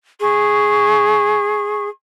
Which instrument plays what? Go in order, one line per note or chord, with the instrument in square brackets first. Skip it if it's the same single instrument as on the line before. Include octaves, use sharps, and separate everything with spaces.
[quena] G#4 [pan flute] C#6